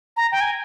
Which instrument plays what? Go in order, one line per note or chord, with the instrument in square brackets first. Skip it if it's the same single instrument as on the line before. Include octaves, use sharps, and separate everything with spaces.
[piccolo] A#5
G5
G#5